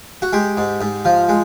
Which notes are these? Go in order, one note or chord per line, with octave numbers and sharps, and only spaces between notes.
F#4
G#3 G4
G#2
G#2
F3
G#3